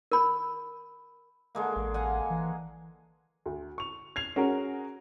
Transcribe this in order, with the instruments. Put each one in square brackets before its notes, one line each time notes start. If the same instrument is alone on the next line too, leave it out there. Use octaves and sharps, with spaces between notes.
[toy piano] A#4 B5
[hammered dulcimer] D3 G#3 A#3
[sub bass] A1
[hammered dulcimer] F5 F#5 G#5
[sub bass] E3
[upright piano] D2
C#6 F7
G#6 C7 F7
C#4 F#4 G#4 A#4